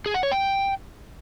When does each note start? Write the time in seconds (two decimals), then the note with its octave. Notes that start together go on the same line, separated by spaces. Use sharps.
0.06 G#4
0.14 F#5
0.23 C#5
0.32 G5